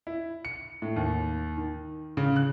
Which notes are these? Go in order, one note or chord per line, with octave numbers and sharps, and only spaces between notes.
E4
C#7
A2
D#2
D#3
C#3
F#6